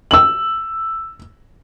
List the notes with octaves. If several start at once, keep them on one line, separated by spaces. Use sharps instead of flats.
E6 F#7